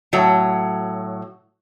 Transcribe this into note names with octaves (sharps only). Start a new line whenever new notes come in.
A2 F#3